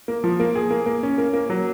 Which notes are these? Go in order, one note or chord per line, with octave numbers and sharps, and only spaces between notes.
A#3
F3
A#3
G#4
A#3
A#3
C#4
A#3
A#3
F#3